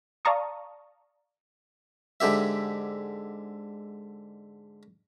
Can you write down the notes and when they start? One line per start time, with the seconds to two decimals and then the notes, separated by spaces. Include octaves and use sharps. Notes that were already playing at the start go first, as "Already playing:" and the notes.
0.25 D5 F5 A5 A#5 C#6 D#6
2.20 G#2 D3 G4 E5